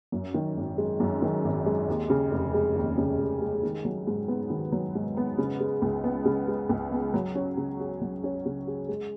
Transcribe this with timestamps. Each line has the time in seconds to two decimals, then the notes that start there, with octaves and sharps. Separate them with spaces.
0.12 F#2
0.34 D#3
0.57 G#1
0.78 G#3
1.00 F#2
1.22 D#3
1.45 G#1
1.66 G#3
1.88 D#2
2.10 C#3
2.32 F1
2.54 G#3
2.76 D#2
2.98 C#3
3.19 F1
3.42 G#3
3.63 D#3
3.85 F#3
4.07 G#2
4.28 B3
4.50 D#3
4.72 F#3
4.95 G#2
5.17 B3
5.38 C#3
5.60 G#3
5.82 C#2
6.04 B3
6.25 C#3
6.48 G#3
6.69 C#2
6.92 B3
7.14 F#3
7.35 C#4
7.57 C#3
7.80 G#4
8.01 F#3
8.24 C#4
8.46 C#3
8.67 G#4
8.89 G#3